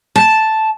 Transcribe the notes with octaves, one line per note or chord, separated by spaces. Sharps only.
A5